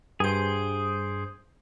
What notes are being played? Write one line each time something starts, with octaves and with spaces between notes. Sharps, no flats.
G2 G#4 C5 D7